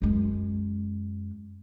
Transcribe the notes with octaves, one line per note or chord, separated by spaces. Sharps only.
F#2 G#3